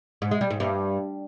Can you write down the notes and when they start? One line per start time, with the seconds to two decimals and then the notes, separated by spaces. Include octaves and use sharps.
0.22 G#2
0.31 G#3
0.41 G3
0.50 G#2
0.60 G2